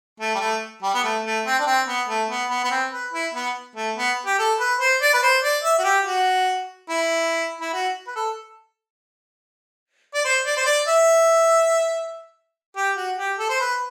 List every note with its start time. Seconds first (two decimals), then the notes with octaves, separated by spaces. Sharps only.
0.20 A3
0.35 G3
0.40 A3
0.83 G3
0.95 B3
1.04 A3
1.25 A3
1.46 C4
1.60 D4
1.67 C4
1.88 B3
2.09 A3
2.30 B3
2.50 B3
2.64 B3
2.71 C4
2.92 B4
3.13 E4
3.34 B3
3.76 A3
3.96 B3
4.26 G4
4.39 A4
4.60 B4
4.80 C5
5.02 D5
5.14 B4
5.23 C5
5.43 D5
5.64 E5
5.79 F#4
5.84 G4
6.05 F#4
6.89 E4
7.61 E4
7.73 F#4
8.07 B4
8.16 A4
10.15 D5
10.25 C5
10.46 D5
10.57 C5
10.66 D5
10.88 E5
12.76 G4
12.97 F#4
13.18 G4
13.39 A4
13.50 C5
13.60 B4